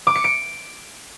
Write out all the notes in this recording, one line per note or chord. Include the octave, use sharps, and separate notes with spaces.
D6
C#7
D7